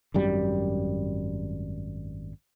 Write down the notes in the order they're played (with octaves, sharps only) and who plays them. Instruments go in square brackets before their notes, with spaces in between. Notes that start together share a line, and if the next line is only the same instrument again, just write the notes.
[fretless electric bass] G#1 F#2 G3